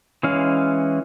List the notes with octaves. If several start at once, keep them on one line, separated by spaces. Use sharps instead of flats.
E3 G#3 C#4 F5